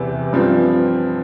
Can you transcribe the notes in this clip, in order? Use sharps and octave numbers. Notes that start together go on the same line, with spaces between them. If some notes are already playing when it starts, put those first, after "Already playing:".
Already playing: E2 C3 E3
G2 F3 C4